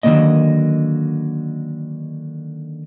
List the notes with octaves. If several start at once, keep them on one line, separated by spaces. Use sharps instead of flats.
D3 D#3 F3 F#3 A#3 D#5